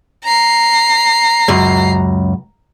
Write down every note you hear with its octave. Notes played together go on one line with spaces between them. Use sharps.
A#5 C7
C#2 F#2